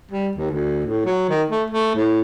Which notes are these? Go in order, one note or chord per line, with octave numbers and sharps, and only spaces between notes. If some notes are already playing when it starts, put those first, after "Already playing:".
G3
D#2
D2
A2
F#3
D#3
A3
A3
A2